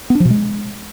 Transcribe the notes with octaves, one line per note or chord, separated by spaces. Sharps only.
B3
D4
F3
B2
G#3